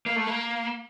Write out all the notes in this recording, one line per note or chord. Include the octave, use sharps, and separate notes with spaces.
A#3
A3
A#3